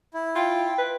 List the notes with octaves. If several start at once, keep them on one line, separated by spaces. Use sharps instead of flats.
E4
F4 G5
B4